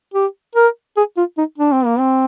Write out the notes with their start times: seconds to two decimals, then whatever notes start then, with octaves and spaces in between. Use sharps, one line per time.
0.14 G4
0.55 A#4
0.97 G#4
1.17 F4
1.38 D#4
1.58 D4
1.72 C4
1.86 A#3
1.99 C4